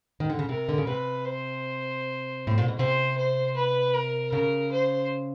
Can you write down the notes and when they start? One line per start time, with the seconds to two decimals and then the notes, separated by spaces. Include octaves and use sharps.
0.20 D#3
0.29 D3
0.39 C#3
0.49 C3 A#4
0.69 D3
0.78 C#3
0.87 C3 B4
1.25 C5
2.47 A2
2.58 A#2
2.68 B2
2.79 C3 C5
3.17 C5
3.56 B4
3.93 A#4
4.32 C#3 A#4
4.71 C5